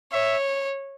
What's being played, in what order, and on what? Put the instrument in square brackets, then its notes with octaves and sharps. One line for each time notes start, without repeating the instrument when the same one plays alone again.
[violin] C#5 [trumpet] E5